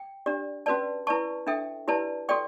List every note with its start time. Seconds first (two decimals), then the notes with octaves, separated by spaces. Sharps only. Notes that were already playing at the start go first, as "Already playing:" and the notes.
Already playing: G5
0.26 D4 G4 D5
0.66 C#4 F#4 B4 D5 A5
1.07 E4 B4 D5 A5 C#6
1.47 D4 A4 E5 G5
1.88 E4 G4 B4 D5 A5
2.29 F#4 A4 D5 G5 C#6